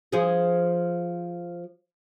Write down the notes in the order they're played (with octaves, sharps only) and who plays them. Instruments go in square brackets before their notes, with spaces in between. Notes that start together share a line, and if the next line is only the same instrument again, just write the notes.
[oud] F3 G#4